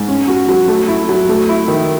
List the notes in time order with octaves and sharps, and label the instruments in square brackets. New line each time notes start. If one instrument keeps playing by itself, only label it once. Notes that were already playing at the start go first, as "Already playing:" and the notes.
Already playing: [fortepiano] G#2
C#4
F#4
F#3
A3
E4
F#3
A3
E4
D#3